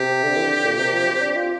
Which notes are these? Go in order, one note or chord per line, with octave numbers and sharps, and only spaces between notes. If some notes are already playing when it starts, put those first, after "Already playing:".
Already playing: C3 G4
D3
E3
D3
A#2
C3
F3
C4
D4
F4